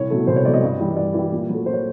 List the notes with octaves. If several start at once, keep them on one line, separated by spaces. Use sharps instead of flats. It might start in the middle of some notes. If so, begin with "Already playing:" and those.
Already playing: C2 C#5
B2 F#3 A3
C2 C5
C#5
B2 F#3 A3 D5
D#5
G2
E3 G3
G2 D5
E3 G3
A#2
F#3 A3
A#2 C5
C#5